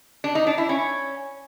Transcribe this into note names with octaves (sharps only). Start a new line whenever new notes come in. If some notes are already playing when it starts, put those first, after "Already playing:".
D4
D#4
D4
E4
C#4